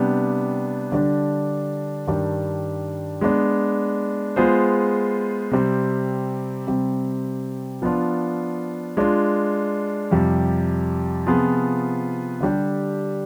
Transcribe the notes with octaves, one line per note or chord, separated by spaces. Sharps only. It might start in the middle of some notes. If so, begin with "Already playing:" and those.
Already playing: C3 G3 B3 D4
D3 G3 D4
G2 D#3 G3 D4
G#3 B3 D4
G#3 B3 F4 G#4 C5
C3 G3 C4
C3 G3 C4
F3 B3 D4 F4
G#3 D4 F4
F2 C3 G3
C3 F3 B3 F4 G#4
D3 G3 D4 G4